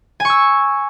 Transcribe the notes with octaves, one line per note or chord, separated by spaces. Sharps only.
G#5 C#6 E6